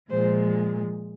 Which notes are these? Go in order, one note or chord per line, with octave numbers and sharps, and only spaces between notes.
A#2 F3 G#3 C5